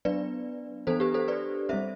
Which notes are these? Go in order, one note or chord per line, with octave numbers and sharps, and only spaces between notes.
F#3 B3 D4 B4 D5
E3 B3 D4 A4 C5
G4 B4
A4 C5
B4 D5
G3 C4 C5 E5